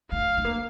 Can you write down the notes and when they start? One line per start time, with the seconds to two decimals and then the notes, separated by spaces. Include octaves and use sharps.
0.11 A3 F5
0.37 A3
0.45 A#3